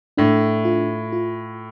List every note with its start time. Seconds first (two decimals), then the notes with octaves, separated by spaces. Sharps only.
0.17 A2 D4
0.65 F4
1.12 F4